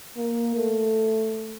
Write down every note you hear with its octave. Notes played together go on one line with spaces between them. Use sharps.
A#3
A3